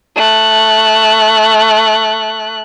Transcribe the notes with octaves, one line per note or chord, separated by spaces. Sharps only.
A3 F#6